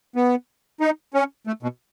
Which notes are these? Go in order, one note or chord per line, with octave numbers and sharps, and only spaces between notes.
B3
D#4
C#4
A3
B2